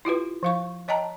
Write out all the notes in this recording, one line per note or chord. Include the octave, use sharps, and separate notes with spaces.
E4 F4 G4 B4
F3 F5 C#6
C#5 D#5 G5 A5 A#5